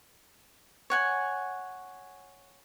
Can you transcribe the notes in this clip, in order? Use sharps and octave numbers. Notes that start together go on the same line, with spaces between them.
C#5 F#5 G#5